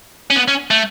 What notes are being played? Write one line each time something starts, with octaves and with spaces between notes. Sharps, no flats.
C#4
B3
C#4
A3